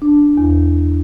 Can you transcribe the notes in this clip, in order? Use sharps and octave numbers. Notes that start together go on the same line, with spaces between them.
D4
E2